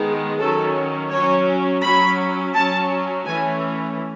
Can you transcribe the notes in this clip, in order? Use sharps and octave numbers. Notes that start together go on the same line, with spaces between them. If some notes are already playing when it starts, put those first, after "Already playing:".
Already playing: D#3 G#3 B3
D#3 F#3 C#4 A4
F#3 C#4 C#5
F#3 C#4 B5
F#3 C#4 A5
E3 A3 C#4 G#5